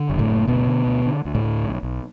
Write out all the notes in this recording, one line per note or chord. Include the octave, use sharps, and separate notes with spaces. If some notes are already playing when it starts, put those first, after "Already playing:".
Already playing: D3
F#1
A2 A3
F#1
D2 B2 B3
D3
D2
D3
D2
A2 A3
D2
B1
B1